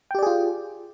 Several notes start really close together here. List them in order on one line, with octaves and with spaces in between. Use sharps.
G5 G4 D5 G#4 F4